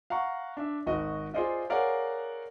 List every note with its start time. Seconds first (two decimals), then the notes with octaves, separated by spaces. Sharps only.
0.10 F5 F#5 A#5 C#6
0.57 D4 E5
0.86 G#1 F#4 D#5
1.34 F4 G#4 C5 D5 D#5 F5
1.70 G#4 A#4 C#5 D5 F5 F#5